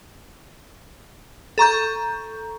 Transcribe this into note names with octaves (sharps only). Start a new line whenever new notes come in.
A4 A#5 C#6 G6